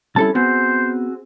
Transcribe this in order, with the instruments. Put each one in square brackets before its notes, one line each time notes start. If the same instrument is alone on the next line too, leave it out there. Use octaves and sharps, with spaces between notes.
[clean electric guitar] G3 C4 C#4 [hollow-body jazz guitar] E4 A4 A5
[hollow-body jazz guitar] B3 [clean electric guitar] C4 F#4 G#4 [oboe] C5